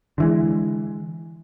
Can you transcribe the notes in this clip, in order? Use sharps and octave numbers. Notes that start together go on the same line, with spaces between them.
D3 E3 G#3